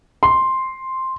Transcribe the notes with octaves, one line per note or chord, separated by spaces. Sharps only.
C6